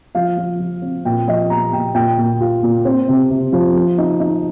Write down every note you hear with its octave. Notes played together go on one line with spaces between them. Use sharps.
F3 F5
F3
F3
C4
A#2 G5
F3 D#5
A#2 A#5
A#2 G5
A#2 G5
A#2
F4
A#2
C4
C3
C3
F3
F3
D#4
D#4